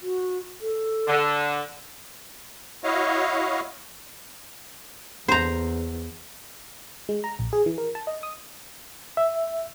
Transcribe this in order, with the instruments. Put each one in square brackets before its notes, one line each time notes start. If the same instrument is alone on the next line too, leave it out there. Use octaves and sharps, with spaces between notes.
[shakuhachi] F#4
A4
[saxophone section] D3
[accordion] E4 F#4 C#5 D#5 F5
[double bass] E2 [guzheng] C5 A#5
[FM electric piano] G#3
A#5
A#1
G#4
E3
A#4
A5
D#5
D#6
[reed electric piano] E5